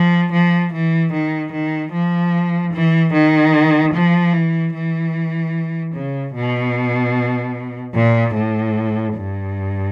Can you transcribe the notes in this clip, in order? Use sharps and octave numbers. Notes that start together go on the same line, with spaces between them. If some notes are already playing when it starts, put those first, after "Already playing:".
Already playing: F3
F3
E3
D#3
D#3
F3
E3
D#3
F3
E3
E3
C#3
B2
A#2
A2
G2